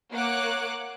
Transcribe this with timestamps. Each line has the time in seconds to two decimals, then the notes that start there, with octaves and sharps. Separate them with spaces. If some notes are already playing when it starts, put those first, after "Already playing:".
0.13 A#3 C#5 F#5 D6 F#6